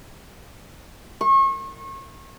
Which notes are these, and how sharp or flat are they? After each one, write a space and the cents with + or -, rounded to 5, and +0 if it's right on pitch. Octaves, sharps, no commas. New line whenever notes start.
C#6 -35